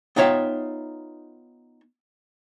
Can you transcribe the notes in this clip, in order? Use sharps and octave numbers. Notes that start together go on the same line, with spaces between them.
B3 D#4 F4 C#5 E5 G5